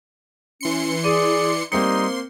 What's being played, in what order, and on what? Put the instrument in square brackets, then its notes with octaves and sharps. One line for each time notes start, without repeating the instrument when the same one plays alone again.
[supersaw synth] E3 C6 C#7 [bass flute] C#4
[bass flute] G#4 [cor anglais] D5 [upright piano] D#7
[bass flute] G3 [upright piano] A#3 C4 C#7 [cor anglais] D#4 [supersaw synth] C6